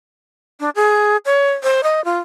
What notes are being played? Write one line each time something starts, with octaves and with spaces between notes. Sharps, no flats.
D4
G#4
C#5
C5
D#5
F4